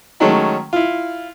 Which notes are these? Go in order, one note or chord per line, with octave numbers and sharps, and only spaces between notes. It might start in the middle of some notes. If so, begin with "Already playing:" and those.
D#3 F#3 G#3 A3 C#4
E4 F4